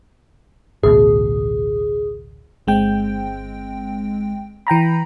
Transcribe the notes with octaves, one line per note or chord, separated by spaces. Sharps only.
A1 D2 B2 G#4
G1 G#3 C4 G5
E3 G5 A#5 B5